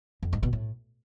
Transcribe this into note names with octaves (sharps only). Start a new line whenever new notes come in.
F2
G#2
B2
A2